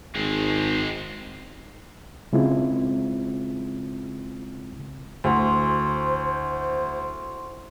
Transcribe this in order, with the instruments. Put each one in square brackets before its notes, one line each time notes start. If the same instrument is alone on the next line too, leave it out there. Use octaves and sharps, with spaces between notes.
[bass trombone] G#1 [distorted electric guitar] G#3 C4
[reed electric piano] C#3 G#3 C4 E4 F4
[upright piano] D2 [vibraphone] E4 C6 C#6 [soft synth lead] C5